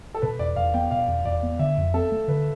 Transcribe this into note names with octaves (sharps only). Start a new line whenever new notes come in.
A4
B2 B4
E2 D5
E2 F5
B3 G5
B2 F5
E2
E2 D5
B3
D3 E5
F2
C4 A4
A3
D3 B4